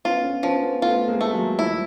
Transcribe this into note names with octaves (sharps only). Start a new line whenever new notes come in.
B3 C#4 F4
B3 C#4
F3 B3 C#4
B3 C#4
A3 B3 F4
G#3 A#3
A3
F#3 G#3
F3 G3 E4
F3